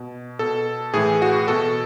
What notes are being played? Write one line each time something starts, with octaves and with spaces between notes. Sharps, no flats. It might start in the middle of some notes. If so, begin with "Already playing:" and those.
Already playing: B2
B2 A4
A2 E3 G#4
F#4
B2 A4